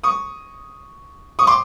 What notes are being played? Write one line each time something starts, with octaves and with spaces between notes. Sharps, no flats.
C#6 D#6
C#6 D#6
C6 D6